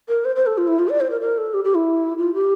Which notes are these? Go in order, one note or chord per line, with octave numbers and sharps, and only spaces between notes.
A#4
C5
C5
A4
F4
E4
F4
D5
C5
A#4
A#4
A4
G4
G4
E4
F4
G4